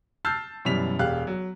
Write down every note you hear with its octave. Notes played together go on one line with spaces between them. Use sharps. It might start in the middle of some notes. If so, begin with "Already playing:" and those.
A5 E6 F6 G6 A6 C7
F#2 B2 E3 G3 B6 F7
E1 G4 F5 F#6
F#3